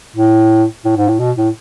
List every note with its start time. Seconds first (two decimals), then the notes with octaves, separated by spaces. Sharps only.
0.16 A2
0.85 A2
0.97 G#2
1.08 A2
1.19 B2
1.37 A2